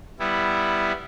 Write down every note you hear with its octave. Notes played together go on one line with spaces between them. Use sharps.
G3 B3 E4